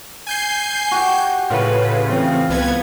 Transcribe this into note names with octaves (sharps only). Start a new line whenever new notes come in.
G#5 G6 C7
F#4 G4
A2 C#3 F4 B4
E3 C4 F4
C2 B3 G#6